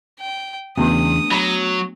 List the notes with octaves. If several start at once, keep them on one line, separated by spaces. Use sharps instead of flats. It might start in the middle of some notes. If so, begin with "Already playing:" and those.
G5
E2 C#3 A3 B3 D4 D#6
F#3 A#5 B5